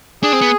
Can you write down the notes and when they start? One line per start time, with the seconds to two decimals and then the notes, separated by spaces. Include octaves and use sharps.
0.23 D4 G#4
0.33 C4
0.41 B3